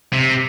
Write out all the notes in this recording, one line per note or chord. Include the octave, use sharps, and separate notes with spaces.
C3